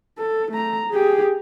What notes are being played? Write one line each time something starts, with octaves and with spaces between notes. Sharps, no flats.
A4
A3 A#5
G4 G#4